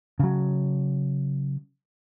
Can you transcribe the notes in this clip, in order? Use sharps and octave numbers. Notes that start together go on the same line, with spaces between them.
C#3 F#3